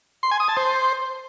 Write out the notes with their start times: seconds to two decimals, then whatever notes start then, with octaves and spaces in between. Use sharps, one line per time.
0.23 C6
0.31 G#5
0.40 D#6
0.48 A5
0.57 C5